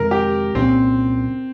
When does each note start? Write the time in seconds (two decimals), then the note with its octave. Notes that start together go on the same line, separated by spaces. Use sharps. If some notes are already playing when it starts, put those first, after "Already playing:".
Already playing: F2 C3 D#3 G#3 A#4
0.11 G4
0.55 C2 A#2 G#3 C4 C#4